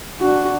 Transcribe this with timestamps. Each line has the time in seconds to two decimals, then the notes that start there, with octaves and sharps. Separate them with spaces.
0.20 D4 F#4